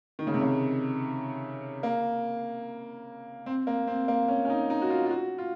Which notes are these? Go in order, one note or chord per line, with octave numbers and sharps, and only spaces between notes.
D#3
C#3
C3
C#3
A#3
C4
A#3
C4
A#3
C#4
C#4
D#4
D#4
F#4
F4
F4
F#4
F4